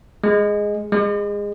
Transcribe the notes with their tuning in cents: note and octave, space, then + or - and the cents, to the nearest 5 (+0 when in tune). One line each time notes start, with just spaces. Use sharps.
G#3 -5
G#3 -25